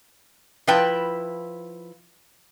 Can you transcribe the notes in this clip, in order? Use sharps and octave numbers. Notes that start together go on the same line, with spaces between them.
F3 E4 B4 G5 A5